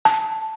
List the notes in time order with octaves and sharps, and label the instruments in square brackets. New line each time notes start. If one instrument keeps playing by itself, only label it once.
[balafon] A5